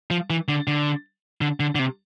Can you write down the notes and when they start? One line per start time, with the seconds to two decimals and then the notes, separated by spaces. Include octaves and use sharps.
0.10 F3
0.30 E3
0.49 D3
0.67 D3
1.41 D3
1.60 D3
1.75 D3
1.79 C3